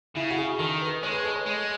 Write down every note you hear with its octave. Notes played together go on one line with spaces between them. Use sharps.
C#3 E4
F#4
G#4
D#3 A4
B4
G#3 C#5
B4
A4
C#5
G#3 D#5